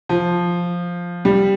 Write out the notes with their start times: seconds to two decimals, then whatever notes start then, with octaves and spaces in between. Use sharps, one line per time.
0.09 F3
1.25 G3